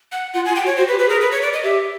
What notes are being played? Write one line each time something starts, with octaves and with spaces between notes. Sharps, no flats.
F#5
F4 F#5
G#5
F4
G5
F#4
C#5
F#4 C5
B4
G4
B4
G#4 A#4
B4
C#5
D5
D#5
G4 E5